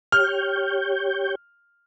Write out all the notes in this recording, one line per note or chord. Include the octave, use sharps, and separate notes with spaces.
G4 C#5 F6 G6